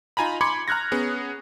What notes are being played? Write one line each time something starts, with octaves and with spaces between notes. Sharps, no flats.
D#4 F4 G#5 A#5 B5
B5 C6 D6 G#6 C#7
A#5 F6 F#6 G#6 A#6
B3 C#4 G#4